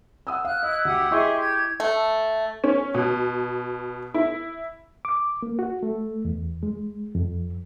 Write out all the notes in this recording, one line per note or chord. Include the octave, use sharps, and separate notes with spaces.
F#5 D#6 E6
F5 F#6
E4 D#5
D2 G4 F#5 D#6
E4 G4 G#4 D#5 E5 C6 C#6
G#6
A3
C#4
B2
E4
D6
A#3
F#4
A3
E2
G#3
F2